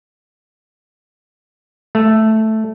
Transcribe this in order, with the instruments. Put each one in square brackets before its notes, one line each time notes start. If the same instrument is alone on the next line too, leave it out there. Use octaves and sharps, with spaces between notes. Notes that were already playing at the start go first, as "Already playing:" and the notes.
[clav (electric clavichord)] A3